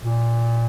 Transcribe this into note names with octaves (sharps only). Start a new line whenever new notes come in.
A#2